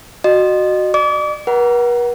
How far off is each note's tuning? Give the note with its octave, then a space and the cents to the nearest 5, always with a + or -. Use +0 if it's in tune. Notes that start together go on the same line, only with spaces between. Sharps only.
F#4 +0 D#5 -30
D5 +40 D6 -35
B4 -45 F#5 +20 A#5 +10